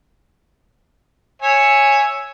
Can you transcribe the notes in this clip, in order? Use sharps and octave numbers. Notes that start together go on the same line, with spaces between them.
C#5 E5 G#5